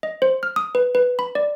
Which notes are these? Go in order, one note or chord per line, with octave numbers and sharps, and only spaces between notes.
D#5
C5
F6
D#6
B4
B4
B5
D5